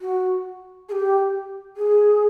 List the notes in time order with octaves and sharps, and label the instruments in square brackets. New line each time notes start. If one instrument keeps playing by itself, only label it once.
[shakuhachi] F#4
G#4
G4
G#4